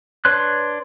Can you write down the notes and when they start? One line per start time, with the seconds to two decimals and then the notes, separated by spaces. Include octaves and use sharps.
0.25 D4 B4 C#5 C6 F#6